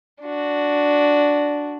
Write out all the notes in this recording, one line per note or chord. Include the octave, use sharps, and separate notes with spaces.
D4 F#4